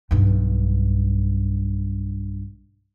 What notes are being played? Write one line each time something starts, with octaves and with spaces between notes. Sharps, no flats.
B1 G2